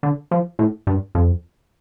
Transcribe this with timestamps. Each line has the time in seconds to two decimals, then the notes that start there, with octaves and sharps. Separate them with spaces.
0.03 D3
0.31 F3
0.59 A2
0.87 G2
1.15 F2